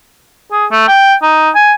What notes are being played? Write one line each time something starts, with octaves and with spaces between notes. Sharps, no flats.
G#4
A3
G5
D#4
G#5